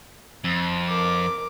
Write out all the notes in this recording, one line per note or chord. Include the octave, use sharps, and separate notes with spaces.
F2
A#4 D6